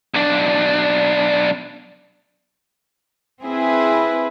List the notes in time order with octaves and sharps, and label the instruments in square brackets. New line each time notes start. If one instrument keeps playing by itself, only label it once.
[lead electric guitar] B1 D4
[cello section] C4 E4 G#4 B4